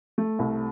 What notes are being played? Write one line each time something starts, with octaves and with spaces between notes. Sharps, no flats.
A3
C2